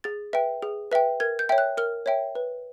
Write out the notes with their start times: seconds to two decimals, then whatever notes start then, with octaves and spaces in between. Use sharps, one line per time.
0.04 G#4 A6
0.33 B4 E5 G5
0.62 G#4
0.92 B4 E5 G5
1.20 A#4 G#6
1.39 G6
1.49 C#5 E5 G5
1.58 F#6
1.77 A#4 F6
2.06 C#5 E5 G5
2.35 B4